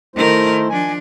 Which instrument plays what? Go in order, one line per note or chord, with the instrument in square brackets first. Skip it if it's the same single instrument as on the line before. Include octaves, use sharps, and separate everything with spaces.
[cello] D#3 A#4 [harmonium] A3 E4 C5
[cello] F3 D4 [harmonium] G#5